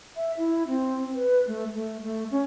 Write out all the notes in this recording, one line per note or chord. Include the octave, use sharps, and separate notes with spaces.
E5
E4
C4
B4
A3
A3
A3
C#4